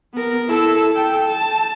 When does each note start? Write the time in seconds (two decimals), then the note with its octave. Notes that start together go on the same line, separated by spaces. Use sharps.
0.13 B3 A#4
0.47 E4 A4
0.92 A4 G5
1.28 A5